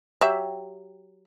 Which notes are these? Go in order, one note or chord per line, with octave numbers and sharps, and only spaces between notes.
F#3 G4 E5